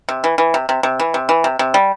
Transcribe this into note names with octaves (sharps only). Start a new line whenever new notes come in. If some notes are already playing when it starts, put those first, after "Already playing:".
C3
E3
E3
C3
C3
C3
E3
C3
E3
C3
C3
G3